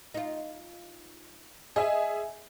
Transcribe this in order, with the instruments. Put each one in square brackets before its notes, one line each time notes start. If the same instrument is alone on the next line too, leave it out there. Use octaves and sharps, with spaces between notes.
[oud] D#4 F4
[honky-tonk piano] G#4 E5 G#5 [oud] D#5